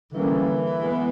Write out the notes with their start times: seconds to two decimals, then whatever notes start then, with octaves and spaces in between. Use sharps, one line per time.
0.13 D3 E3 G3 A#3 C#4
0.80 G#3 B3